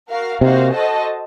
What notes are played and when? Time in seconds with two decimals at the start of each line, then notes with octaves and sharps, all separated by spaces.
0.10 F#4 A#4 F5
0.41 C3 A#3 D#4 F#4 C5 F5
0.73 F#4 A4 C5 D#5 A5